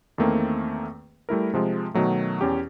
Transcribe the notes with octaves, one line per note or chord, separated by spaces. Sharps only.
E2 D#3 A3 A#3 C4
G3 A3 E4 A#4
C3 F3 G#3
B2 D#3 F#3 A3
E2 C#4 G4